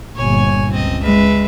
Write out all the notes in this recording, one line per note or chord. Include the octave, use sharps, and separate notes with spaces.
G1 A#2 C#5 G#5
C#2 C4 D#5
G#3 B4 E5